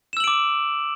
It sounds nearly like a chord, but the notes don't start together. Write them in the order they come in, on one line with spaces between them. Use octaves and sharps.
E7 E6 F#7 D7 D6